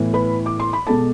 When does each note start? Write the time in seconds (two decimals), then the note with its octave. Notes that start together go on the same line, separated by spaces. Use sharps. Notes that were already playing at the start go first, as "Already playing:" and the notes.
Already playing: A2 E3 B3
0.14 B4 B5
0.46 D6
0.60 C6
0.73 B5
0.87 B2 G#3 A4 A5